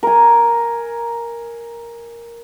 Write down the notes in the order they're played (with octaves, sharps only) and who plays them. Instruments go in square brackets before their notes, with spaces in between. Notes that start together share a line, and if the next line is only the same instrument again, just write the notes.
[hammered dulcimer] A#4 G#5